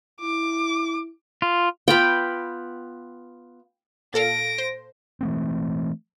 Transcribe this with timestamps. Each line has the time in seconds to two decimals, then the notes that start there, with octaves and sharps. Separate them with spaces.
0.21 E4 D6
1.42 F4
1.88 B3 F4 G5 B5
4.14 A#2 A4 F5 A#6 D7
4.58 C5
5.21 E3 A3 C4